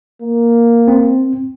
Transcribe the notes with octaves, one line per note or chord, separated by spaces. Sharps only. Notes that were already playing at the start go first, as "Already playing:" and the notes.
A#3
C4